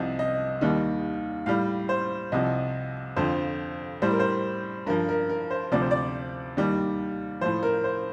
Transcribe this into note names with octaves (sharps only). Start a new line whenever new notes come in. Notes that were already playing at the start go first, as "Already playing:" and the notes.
Already playing: C2 C3 F3 D#5
D#5
D#2 D#3 G3
A2 G3 F5
C5
C2 C3 F3 D#5
F2 D3 F3 C5
A2 G3 C5
A#4
C5
G2 F3 A#4
A#4
A#4
C5
D2 C3 F3 D5
C5
D5
D#2 D#3 G3
A2 F3 C5
A#4
C5